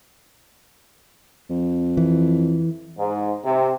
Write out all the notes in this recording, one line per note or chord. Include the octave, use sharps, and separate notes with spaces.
F2
E3
G#2
C3